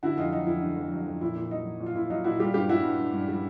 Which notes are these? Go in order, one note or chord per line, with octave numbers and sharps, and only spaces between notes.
D3 E4 F#4
F2 D#4 F4
F#3 D#4
F2 E4
D3
F2
F#3
F2
A#2 E4
A#2
F#3 D#4
F#3
A#2
F4
A#2 E4
F#3 D#4 F4
A#2 E4 F#4
G3 F4 G4
G2 F4 G4
G3 E4 F#4
G2
G2
G2
G3